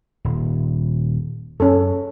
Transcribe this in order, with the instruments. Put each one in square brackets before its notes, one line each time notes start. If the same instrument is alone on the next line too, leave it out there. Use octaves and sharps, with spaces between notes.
[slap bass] D#1
[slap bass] F#2 [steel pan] C#4 A4